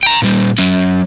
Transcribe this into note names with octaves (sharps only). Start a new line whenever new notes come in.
G5 A#5
A#2 G3
F#3 C#4